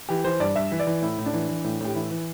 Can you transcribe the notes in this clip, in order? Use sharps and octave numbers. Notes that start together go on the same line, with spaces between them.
E3 G4
E3 C5
G2 D5
G2 E5
E3
D5
E3
A2 E4
A2
D4
E3
E3
A2
A2 G4
E3 E4
E3